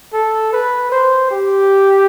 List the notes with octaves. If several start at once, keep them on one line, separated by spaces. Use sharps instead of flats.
A4
B4
C5
G4